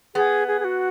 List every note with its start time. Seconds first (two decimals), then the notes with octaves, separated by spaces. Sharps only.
0.15 B3 G#4
0.48 G#4
0.60 G#4
0.64 F#4